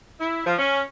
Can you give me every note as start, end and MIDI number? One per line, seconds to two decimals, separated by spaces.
0.20 0.44 64
0.46 0.54 53
0.59 0.80 61